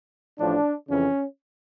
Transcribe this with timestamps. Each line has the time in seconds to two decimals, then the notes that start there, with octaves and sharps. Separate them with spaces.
0.38 A1 A2 F3 D4
0.88 F2 C#3 E3 C#4